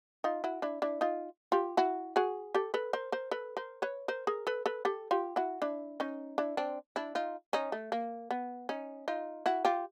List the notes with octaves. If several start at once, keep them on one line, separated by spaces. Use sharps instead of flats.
D#4 F4
E4 F#4
D4 E4
D4 E4
D#4 F4
F4 G4
E4 F#4
F#4 G#4
G4 A4
A4 B4
A#4 C5
A#4 C5
A4 B4
A#4 C5
B4 C#5
A#4 C5
G#4 A#4
A4 B4
A4 B4
G4 A4
F4 G4
E4 F#4
D4 E4
C#4 D#4
D4 E4
C4 D4
D4 E4
D#4 F4
C#4 D#4
A3
A#3
B3
C#4 D#4
D#4 F4
E4 F#4
F4 G4